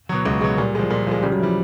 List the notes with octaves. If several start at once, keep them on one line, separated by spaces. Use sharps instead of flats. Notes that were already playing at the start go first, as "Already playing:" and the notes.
B2 F#3
C#2 G#3
B2 F#3 G#3
A#2 G3
F3 G#3
A#2
F3 G#3
C#3 G3
F#3
E3 F3 G3